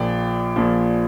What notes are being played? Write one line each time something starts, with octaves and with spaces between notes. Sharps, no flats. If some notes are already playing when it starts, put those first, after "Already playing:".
Already playing: A#1 A#2 F3 D5 G5
A#1 A#2 F3